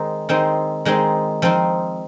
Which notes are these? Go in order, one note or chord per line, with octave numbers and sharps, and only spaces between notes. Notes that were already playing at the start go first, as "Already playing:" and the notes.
Already playing: D#3 G#3 C4 D#4
D#3 G#3 C4 D#4
D#3 G#3 C4 D#4
F3 C4 D#4